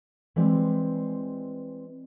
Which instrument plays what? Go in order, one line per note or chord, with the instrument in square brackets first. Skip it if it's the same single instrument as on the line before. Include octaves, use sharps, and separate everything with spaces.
[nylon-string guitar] E3 G3 G#3 C4 G4